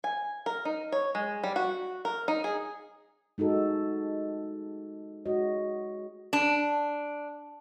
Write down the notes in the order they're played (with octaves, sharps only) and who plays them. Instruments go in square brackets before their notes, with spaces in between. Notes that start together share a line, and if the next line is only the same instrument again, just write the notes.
[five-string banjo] G#5
A#4
D#4
C#5
G#3
G3
F#4
A#4
D#4
G#4
[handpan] G#3 D#4 F#4 A4
G#3 F#4 C#5 D#5
[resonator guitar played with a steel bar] D4